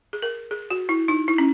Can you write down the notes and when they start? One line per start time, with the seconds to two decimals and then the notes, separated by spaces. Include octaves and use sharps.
0.13 G#4
0.22 A#4
0.51 G#4
0.71 F#4
0.89 E4
1.08 D#4
1.28 E4
1.38 C#4